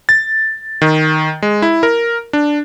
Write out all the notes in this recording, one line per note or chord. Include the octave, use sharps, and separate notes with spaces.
A6
D#3
G#3
E4
A#4
D4